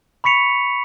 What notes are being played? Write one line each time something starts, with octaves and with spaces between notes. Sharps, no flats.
B5 C#6 B6 C#7 F7